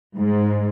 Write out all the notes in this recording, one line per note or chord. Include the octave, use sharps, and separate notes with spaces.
G#2